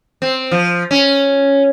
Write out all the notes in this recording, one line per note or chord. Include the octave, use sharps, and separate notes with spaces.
C4
F3
C#4